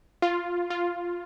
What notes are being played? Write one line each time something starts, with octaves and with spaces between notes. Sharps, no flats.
F4
F4